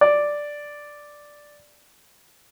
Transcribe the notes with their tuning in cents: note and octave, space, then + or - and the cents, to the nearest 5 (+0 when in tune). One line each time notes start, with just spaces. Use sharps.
D5 +0